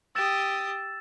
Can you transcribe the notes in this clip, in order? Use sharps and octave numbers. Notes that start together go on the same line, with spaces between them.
G4 D#6 E6 A6 E7